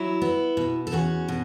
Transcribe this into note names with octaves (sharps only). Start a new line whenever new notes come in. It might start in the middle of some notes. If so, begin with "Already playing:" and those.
Already playing: F#3 E4
B3
B2
A4
E2 C#4 F#4
B2